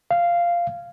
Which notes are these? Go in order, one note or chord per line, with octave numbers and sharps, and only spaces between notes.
F5